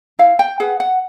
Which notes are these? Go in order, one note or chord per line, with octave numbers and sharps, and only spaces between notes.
E4 F5
G5
G#4 B4 F#5
F#5